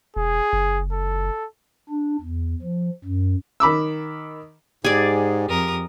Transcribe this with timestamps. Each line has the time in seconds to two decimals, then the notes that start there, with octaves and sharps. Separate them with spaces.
0.16 E1 G#4
0.53 F#1
0.92 A4
1.89 D4
2.21 E2
2.62 F3
3.04 F#2
3.60 D#3 B5 D6 E6
4.85 G#2 G4 G#4 D5
5.47 F2 A#4 D#6